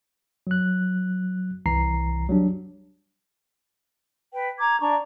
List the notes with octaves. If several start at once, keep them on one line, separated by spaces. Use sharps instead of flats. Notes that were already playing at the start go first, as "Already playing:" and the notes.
F#3 F#6
C2 E3 A#5 C7
F#3 G3 D4
B4 G5
A#5 D6 G#6
D4 A#5 C#6